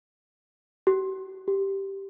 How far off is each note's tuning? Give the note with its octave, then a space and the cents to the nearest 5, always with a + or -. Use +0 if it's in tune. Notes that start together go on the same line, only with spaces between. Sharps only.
G4 -45
G4 -5